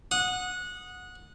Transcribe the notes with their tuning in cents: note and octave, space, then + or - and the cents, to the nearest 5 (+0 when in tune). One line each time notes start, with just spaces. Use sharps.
F#5 -20 D#6 +0